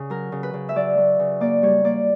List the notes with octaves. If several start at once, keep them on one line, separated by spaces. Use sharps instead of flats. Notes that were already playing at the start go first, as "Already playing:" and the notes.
Already playing: C#3
F#3 A#4
C#3
B4
C#3
E5
F#3 D5
F#3
C#3
A#3 D5
G3 C#5
A#3 D5